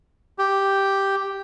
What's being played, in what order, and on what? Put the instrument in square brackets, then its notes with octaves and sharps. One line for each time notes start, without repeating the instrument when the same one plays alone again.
[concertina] G4